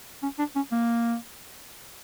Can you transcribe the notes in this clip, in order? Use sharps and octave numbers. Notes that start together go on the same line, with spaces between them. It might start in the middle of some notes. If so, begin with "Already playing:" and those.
C#4
D4
C#4
A#3